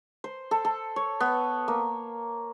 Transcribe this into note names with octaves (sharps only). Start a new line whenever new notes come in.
C5
A4
A4
C#5
B3
A#3